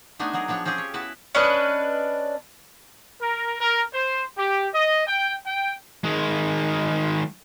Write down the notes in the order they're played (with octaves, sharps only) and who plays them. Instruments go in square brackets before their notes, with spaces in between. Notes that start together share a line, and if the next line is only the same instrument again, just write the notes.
[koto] A3 B3 D4 D#4 G#5
F#3 F#4 G#4 A#4
F3 B3 D4 C#5
C4 C#4 F4 G4 G#4
C#5
B3 E4 F#4 B4 A5
[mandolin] C#4 D4 B4 D#5
[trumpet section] A#4
A#4
C5
G4
D#5
G5
G5
[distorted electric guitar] D#3 G#3